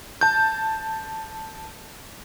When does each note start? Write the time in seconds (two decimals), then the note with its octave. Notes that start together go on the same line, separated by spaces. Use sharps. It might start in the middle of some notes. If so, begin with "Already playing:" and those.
0.21 A5 G6